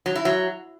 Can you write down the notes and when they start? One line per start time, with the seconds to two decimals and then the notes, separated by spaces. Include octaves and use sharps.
0.06 F#3
0.15 E4
0.25 F#3